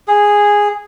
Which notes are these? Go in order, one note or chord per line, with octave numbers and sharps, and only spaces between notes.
G#4